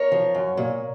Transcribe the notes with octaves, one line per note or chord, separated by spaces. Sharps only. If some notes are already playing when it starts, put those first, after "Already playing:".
Already playing: A#4 C#5
F3
F#2
A#2